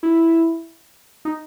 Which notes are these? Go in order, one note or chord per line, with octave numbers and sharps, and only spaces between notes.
E4
D#4